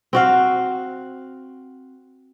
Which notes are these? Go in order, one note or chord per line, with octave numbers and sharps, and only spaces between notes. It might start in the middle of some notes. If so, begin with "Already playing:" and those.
C4 F#4 F5